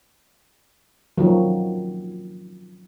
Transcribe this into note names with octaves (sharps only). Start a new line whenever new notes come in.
D#3 F3 F#3